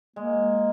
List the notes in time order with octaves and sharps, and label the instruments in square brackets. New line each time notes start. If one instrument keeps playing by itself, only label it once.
[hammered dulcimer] G#3 [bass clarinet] A#3